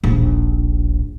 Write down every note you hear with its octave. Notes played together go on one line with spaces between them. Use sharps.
D#1 A#1